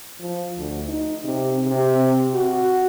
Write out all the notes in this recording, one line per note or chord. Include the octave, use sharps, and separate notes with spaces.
F3
D2
D#4
C3
C3
F#4